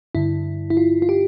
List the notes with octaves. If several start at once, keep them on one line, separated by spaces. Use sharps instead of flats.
G2 D3 E4
E4
F4
F4
G4